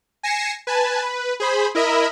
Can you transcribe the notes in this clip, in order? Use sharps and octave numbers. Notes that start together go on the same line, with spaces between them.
G#5 A#6 C7 C#7 E7
B4 G#5 A5
B4
G#4 C5 B5
E4 A#4 D#5 E5 B5